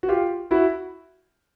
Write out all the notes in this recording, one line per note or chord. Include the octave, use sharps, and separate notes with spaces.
F#4
F4 G4
E4 F#4